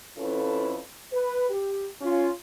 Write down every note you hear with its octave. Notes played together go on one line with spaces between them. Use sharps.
F2 C#4 E4 F4 A4 B4
B4
G4
C#4 F4